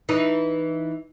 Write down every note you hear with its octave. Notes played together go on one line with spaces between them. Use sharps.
E3 D#4